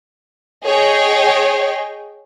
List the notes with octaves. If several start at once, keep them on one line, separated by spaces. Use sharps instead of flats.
G#4 C#5 D#5 G5